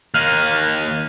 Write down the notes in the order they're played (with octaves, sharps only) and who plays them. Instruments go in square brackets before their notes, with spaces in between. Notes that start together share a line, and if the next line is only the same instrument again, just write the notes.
[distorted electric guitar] D#2 A#3 [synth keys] F6 F#6 D#7